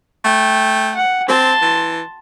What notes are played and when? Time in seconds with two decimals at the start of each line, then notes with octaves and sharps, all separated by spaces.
0.25 A3 G5
0.95 F#5
1.29 C4 A5 C6
1.62 E3